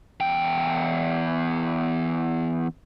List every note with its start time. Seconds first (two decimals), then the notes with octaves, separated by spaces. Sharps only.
0.20 E2 G5